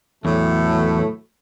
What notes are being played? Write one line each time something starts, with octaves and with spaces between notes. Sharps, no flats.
E2 A2 F#3 A3